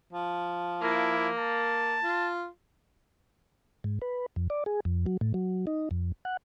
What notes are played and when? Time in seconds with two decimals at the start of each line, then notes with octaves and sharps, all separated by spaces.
0.13 F3
0.82 A#3 E4
1.38 A5
2.04 F4
3.84 G#2
4.02 B4
4.36 F2
4.50 D5
4.66 G#4
4.85 F2
5.06 F#3
5.21 A2
5.34 F#3
5.67 D#4
5.91 F2
6.25 F#5